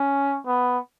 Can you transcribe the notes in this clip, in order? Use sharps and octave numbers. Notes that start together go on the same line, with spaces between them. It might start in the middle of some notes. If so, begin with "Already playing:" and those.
Already playing: C#4
B3